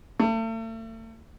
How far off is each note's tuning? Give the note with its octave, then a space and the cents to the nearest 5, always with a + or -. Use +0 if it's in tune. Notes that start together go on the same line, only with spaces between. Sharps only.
A3 +40